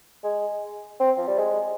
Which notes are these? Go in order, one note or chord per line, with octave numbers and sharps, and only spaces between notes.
G#3
C4
F3
G3
G#3